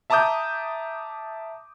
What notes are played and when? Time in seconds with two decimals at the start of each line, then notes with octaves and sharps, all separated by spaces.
0.10 E5 A5 A#5 D6 D#6 G6